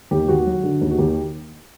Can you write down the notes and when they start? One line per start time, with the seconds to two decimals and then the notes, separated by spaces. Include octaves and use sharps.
0.11 D#2 G4
0.28 D#2 F#4
0.46 F#3
0.64 D3
0.81 D#2
0.91 F#4
0.99 D#2 G4